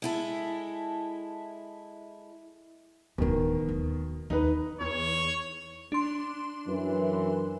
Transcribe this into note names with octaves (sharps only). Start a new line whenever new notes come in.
G#3 E4 A4
D1 B2 D3 D#3
D#2
D#2 D#4 B4
E2 C#5
D4 C6
F#2 E3